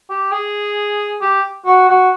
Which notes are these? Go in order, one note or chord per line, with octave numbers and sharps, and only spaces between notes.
G4
G#4
G4
F#4
F#4